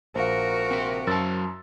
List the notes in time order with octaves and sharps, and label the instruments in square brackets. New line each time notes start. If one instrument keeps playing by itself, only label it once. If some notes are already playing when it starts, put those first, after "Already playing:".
[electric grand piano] A#1 [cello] F#4 A#4 [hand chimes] C5 F5
[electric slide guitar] C4 E5
[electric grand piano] F#2 E6 A6 [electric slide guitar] F#3 A5